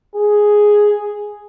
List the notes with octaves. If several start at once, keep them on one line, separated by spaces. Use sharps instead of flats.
G#4